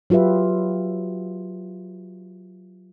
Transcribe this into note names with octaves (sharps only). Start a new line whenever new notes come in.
F#3 F4 G4 B4 E5